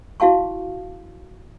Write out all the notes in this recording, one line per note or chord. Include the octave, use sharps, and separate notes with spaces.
E4 F#4 F5 A5 C#6